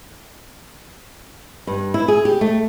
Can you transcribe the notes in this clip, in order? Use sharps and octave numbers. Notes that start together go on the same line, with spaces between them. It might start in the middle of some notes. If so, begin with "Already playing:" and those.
G2
E4
G#4
G4
A3